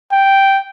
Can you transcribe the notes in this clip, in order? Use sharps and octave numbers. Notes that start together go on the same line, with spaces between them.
G5